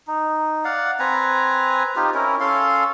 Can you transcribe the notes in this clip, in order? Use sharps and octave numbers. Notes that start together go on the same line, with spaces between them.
D#4
D5 F5 F#5
C4 B4 G#5 A#5
D#4 F4 G4
C#4 E4 A#4
C#4 A4 F5 C6